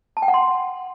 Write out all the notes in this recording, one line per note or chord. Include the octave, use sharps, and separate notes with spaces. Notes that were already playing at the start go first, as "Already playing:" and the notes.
A5
G5
F#5
C6